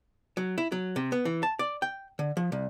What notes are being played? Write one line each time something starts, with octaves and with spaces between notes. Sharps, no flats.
F#3
E4
F#3
C3
B3
E3
A5
D5
G5
D3
F3
C2